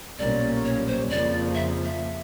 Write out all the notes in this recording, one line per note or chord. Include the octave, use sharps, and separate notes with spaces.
B1 A#2 G3 A#3 C#4 D5
C#5
C5
F2 C#3 F3 A#3 D5
E5
E5